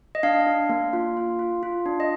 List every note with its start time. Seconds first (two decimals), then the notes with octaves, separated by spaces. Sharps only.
0.15 D#5
0.23 D4 F5
0.47 D4
0.69 A#3
0.93 F4
1.17 F4
1.39 F4
1.63 F4
1.86 D4
2.00 D#5